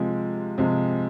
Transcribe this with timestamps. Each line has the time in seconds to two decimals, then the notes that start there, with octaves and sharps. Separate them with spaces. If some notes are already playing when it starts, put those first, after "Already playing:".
Already playing: C3 F3 G#3
0.58 C3 F3 G#3